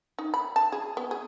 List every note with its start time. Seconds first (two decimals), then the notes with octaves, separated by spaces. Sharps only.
0.19 D#4
0.34 B5
0.56 A5
0.72 G#4
0.97 B3
1.11 G#4